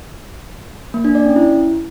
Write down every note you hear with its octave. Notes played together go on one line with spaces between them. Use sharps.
A#3
D4
D5
C#4
E4